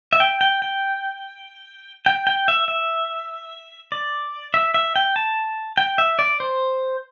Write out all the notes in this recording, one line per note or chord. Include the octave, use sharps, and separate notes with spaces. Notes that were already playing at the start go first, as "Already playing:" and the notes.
E5
G5
G5
G5
G5
G5
E5
E5
D5
E5
E5
G5
A5
G5
E5
D5
C5